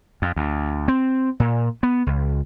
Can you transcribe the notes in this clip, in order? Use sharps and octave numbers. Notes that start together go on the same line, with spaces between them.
F2
D2
C4
A#2
B3
C#2